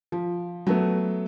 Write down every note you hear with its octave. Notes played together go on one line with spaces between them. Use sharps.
F3
F#3 A3 B3